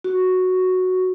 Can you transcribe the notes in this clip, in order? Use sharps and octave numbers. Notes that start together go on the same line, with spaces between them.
F#4